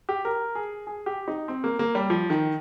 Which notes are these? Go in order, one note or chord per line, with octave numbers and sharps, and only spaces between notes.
G4
A#4
G#4
G#4
G4
D#4
C4
A#3
A#3
G3
F3
D#3